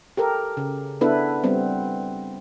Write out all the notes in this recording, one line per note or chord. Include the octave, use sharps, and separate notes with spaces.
G4 A4 A#4
C#3
B3 D4 E4 A4 B4
G3 B3 C4